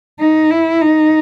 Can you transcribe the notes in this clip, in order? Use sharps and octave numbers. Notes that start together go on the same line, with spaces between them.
D#4
E4
D#4